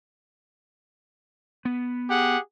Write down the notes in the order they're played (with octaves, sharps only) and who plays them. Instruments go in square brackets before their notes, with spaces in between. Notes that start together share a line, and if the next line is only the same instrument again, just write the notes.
[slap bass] B3
[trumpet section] G4 G#4 F#5